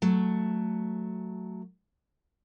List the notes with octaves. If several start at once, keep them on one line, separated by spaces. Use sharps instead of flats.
F#3 A3